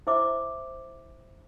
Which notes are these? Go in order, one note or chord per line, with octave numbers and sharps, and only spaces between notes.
E4 C5 E5 D6